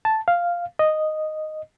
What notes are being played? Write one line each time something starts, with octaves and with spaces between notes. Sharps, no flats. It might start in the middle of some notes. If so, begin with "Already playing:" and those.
A5
F5
D#5